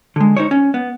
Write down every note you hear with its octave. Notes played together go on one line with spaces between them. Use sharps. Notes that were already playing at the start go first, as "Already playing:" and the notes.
D3 G#3
D#4 C5 C#5
C#4
B3